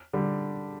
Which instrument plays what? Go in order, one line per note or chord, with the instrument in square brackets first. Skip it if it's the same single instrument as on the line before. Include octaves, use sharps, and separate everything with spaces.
[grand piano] D3 G3